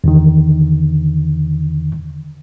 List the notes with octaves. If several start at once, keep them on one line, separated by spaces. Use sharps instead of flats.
E2 D3 D#3